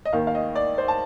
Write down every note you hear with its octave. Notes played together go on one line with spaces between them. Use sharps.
D#5
D#2 D#3 F5
F5
D#5
D5
C5
A5